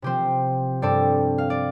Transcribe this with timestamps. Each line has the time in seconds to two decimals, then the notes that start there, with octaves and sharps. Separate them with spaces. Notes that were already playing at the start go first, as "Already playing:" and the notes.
0.02 C3 F3 C4 G4 C5
0.82 G2 G3 C4 A4 D5
1.38 F5
1.50 D5